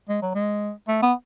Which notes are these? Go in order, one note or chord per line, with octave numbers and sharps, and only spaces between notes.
G#3
F#3
G#3
A3
B3